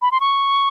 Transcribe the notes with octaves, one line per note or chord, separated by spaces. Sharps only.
B5
C6
C#6